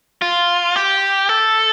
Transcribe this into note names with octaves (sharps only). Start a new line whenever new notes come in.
F4
G4
A4